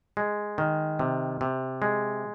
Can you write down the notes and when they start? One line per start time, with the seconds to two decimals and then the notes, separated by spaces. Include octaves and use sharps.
0.17 G#3
0.58 D#3
0.99 C3
1.41 C3
1.82 G#3